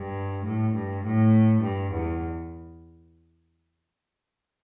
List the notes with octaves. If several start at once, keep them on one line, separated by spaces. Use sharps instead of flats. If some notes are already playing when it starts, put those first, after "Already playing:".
Already playing: G2
A2
G2
A2
G2
E2